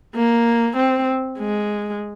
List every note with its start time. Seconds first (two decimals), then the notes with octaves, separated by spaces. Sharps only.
0.16 A#3
0.77 C4
1.39 G#3